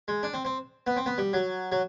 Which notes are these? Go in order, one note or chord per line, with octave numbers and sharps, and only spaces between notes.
G#3
D4
C4
C4
B3
C4
B3
G3
F#3
F#3